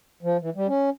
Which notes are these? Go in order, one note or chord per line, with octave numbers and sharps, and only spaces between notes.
F3
E3
G3
C#4